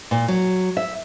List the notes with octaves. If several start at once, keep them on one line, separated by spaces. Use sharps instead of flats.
A#2
F#3
E5